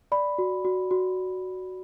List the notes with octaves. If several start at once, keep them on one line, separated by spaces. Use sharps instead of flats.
D5 B5
F#4
F#4
F#4